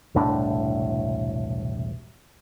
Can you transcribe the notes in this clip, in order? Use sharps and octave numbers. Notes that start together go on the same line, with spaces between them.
E1 C2 A2 D4